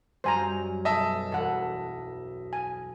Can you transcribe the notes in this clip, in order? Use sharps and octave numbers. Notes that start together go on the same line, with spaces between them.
F#2 G3 C5 G#5 A#5
B1 D#5 E5 A5
E1 A4 F#5
G#5